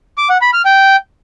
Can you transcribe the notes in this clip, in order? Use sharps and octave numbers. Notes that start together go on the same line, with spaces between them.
D6
F#5
B5
F6
G5